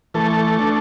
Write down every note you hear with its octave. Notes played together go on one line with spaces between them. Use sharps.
E3 A3 A4
D4